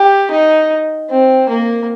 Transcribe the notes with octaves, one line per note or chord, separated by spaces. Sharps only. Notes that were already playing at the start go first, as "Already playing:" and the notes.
Already playing: G4
D#4
C4
A#3